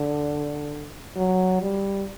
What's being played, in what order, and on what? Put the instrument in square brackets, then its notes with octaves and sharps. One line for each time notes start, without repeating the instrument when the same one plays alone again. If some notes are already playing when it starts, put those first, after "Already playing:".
Already playing: [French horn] D3
F#3
G3